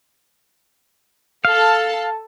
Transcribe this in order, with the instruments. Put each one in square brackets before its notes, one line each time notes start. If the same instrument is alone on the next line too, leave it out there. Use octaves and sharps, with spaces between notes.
[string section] A4 A5 [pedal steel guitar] F5